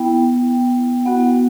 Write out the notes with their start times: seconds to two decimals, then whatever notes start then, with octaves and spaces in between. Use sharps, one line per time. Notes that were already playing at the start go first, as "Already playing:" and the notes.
Already playing: B3 E4 G5
1.05 B3 F#4 F#5